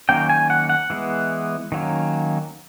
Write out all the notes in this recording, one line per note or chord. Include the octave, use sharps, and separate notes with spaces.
D#3 F#3 A#3 C#4 G5
G#5
F#5
F#5
E3 G#3 B3
D#3 F#3 A#3 C#4